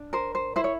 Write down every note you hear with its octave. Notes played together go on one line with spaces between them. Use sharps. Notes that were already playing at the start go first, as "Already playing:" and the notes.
Already playing: D4
A#4 C5
C5
E4 C5
C#5